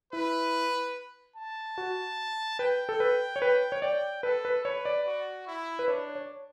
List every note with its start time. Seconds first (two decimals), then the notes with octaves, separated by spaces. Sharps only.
0.13 E4 B4
1.36 A5
1.78 F#4
2.59 B4 G5
2.89 A4
3.00 B4
3.36 C#5
3.42 B4 G5
3.72 C#5
3.82 D5 G5
4.23 A4 B4
4.45 B4
4.65 B4 C#5
4.85 D5
5.06 F#4
5.47 E4
5.79 B4
5.88 D4 C#5
6.15 C#5